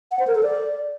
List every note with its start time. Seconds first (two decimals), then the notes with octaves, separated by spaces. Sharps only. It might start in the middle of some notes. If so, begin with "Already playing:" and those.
0.11 F#5
0.19 C5
0.27 A#4
0.35 A4
0.43 D5